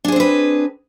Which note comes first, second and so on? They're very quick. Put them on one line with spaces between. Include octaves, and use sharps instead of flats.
D4 G#4 C5 C4 B4